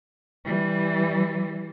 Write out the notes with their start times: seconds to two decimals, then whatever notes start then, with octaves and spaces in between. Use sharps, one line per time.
0.45 E3 G3